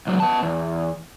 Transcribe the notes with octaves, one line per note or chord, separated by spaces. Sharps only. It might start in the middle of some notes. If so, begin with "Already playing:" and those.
C#2 F#3
B3 A5
E2